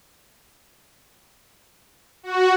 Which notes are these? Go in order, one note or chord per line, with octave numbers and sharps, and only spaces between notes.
F#4